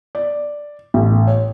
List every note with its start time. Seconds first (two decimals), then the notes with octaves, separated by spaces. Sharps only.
0.15 D5
0.94 A1
1.27 C#5